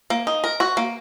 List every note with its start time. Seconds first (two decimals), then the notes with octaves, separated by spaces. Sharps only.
0.10 A#3
0.27 D#4
0.44 A#4
0.60 F#4
0.77 A#3